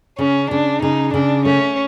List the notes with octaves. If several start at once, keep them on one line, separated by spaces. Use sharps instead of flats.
C#3 C#4
C#3 D4
C#3 D#4
C#3 D4
A3 C#4